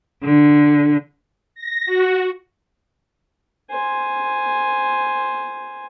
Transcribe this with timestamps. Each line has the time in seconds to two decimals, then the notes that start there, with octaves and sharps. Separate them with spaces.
0.24 D3
1.55 A#6
1.86 F#4
3.70 C5 G#5